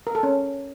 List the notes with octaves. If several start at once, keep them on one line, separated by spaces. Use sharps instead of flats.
A#4
A4
C#4